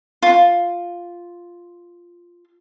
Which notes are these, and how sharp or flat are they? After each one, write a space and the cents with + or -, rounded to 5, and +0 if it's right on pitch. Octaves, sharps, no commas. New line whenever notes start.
F4 +0 C6 +0